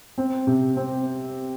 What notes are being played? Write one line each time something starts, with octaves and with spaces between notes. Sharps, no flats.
C4
C3
C4